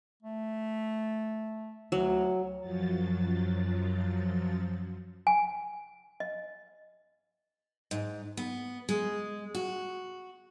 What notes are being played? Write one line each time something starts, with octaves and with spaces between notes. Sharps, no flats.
A3
D2 F#3
F#2 F3 F#3 A6
G#5
D#5
G#2
B3
G#3
F#4